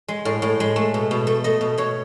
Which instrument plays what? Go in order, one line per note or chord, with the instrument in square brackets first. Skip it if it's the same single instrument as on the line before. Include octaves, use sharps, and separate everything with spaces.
[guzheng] G#3
A2
A2
G#3
A3
B2
B2
A3
A3 D#5
B2
B2 C#5